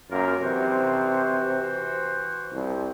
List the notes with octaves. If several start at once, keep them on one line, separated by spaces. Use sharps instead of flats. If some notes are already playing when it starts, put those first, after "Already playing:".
F#2 A#3 F4 A#4
C3 E3 F#4 C5
C2